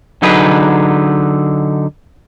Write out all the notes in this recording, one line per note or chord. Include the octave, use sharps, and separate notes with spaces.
D3 F#3 D#4 G#4 B4